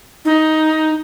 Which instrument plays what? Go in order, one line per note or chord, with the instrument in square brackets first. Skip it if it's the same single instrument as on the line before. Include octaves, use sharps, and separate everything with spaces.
[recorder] D#4